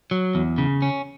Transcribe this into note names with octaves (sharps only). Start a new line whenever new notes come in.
F#3
E2
C#3
C#4